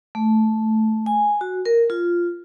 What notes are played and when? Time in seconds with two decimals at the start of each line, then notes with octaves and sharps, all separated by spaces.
0.15 A3
1.06 G#5
1.41 F#4
1.66 A#4
1.90 F4